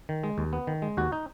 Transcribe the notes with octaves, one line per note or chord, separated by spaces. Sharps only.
D#3
G#3
D#2
B3
D#3
G#3
D#2 F#4
D#4